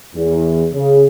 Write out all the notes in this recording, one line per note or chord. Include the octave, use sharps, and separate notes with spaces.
E2
C#3